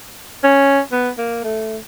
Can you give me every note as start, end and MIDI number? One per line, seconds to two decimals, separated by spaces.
0.44 0.80 61
0.92 1.10 59
1.18 1.43 58
1.44 1.77 57